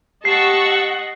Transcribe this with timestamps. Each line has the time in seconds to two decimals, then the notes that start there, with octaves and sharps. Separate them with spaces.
0.25 G4 D#5 F#5 A5 C#6 E6 C7